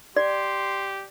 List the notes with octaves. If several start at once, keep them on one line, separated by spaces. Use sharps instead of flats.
G4 D5 C6